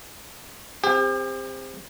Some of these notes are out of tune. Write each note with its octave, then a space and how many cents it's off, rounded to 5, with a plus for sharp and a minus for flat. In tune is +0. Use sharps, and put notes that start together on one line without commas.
C4 +0 G4 +40 G5 +10